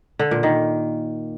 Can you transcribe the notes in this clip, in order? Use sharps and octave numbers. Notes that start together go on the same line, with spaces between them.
D3
A#2
D#3